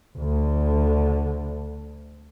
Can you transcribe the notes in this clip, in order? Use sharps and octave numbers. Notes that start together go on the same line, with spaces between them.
D2 D3